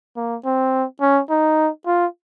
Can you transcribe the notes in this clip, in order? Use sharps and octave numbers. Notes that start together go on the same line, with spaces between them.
A#3
C4
C#4
D#4
F4